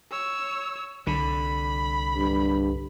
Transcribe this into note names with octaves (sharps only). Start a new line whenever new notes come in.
C#5 E6
C2 D3 B5
G2